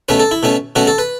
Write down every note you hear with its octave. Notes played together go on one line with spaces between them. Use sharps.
B2 A3 C#4 B4
A4
E4
B2 A3 C#4
B2 A3 C#4 F#4
A4
B4